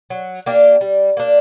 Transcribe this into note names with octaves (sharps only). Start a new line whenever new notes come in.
F#3
A#3 D4 G4
G3
A#3 D4